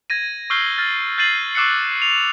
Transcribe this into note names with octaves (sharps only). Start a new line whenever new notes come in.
G#6 A#6 D#7
C#6 E6 F6 G6 C7 G7
F6 A6
G6 A6 C7 D#7 F#7
C#6 D6 E6 F#6 C7 C#7
F7